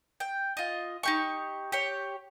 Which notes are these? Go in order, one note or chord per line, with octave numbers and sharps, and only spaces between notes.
G5
F4 D#5
D#4 G4 C#6
G4 C#5